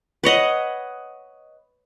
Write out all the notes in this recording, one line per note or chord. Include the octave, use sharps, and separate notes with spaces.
B4 C#5 D#5 F#5